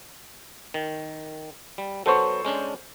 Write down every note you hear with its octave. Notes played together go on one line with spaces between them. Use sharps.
D#3
G3
F#3 B3 A4 C5 C#6
G#3 C#4 D4